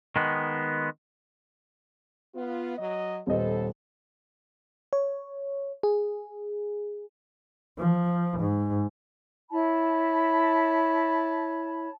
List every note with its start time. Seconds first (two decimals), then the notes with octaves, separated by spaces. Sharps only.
0.16 D#3 G#3 B3
2.35 B3 F4
2.78 F#3 D#5
3.27 D#1 B3 A4 C5 D#5
4.93 C#5
5.83 G#4
7.78 F3
8.40 G#2
9.50 E4 C#5 A5 B5